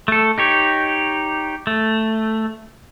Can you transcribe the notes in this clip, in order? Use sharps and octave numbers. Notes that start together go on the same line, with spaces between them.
A3 A4
D#4 G4 C#5
A3